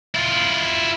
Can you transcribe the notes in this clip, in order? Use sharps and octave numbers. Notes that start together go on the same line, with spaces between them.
E4 F4